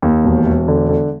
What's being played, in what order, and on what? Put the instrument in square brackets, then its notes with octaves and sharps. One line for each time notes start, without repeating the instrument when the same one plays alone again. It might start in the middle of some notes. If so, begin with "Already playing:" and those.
[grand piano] D#2
E1
E1
D3
D3